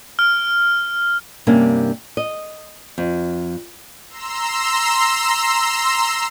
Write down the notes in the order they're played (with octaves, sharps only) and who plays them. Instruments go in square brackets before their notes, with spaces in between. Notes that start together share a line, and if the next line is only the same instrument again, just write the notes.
[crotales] F6
[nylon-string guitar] G2 C3 A#3 C#4 D4
D#5
F2
[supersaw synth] A#5 C6 E6